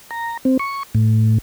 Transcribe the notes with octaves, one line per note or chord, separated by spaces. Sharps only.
A#5
C4
C#6
A2